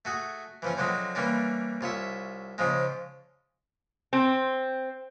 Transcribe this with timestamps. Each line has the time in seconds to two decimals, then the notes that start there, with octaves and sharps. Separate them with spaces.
0.05 A3 F#4 G#4
0.62 E3 F3 C#4
0.77 D3 F3 F#3 G#3 C4
1.15 E3 G3 A#3 C#4 D4
1.81 C2 F4 C#5 E5
2.58 G#2 C#3 F3 G#3
4.13 C4